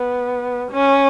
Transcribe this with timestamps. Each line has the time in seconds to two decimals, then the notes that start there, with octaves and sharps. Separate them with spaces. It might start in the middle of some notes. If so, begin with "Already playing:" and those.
Already playing: B3
0.71 C#4